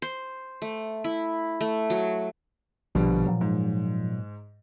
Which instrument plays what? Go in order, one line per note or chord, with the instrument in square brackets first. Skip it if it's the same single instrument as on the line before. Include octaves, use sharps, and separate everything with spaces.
[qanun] C5
A3
E4
A3
F#3
[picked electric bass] A#1 [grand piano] B2 D3 G3 [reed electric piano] F3
[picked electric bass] A#2 F#3
[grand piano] G#2